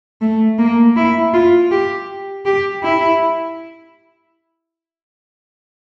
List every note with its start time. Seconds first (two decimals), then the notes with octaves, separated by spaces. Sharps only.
0.22 A3
0.59 A#3
0.96 E4
1.34 F4
1.71 G4
2.46 G4
2.83 E4